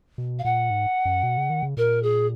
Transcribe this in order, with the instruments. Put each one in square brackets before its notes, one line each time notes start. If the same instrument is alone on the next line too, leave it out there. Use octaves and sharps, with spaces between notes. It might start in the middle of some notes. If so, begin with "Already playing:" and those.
[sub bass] B2
[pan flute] F5
[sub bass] A#2 [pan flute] F#5
[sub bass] G#2
F#2
B2
C#3
D#3
C#3
[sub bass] A#2 [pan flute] A#4
[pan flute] G#4